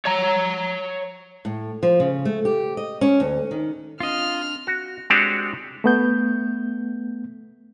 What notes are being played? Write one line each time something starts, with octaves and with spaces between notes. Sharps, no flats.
C#5 A#5
A2
F3
C#3
A3
G4
D#5
C#4
D2
D#3
C4 D4 F4 D#5 F6
F#4
G#3 C4 D4 F#4 G4 F#5
A3 B3 G6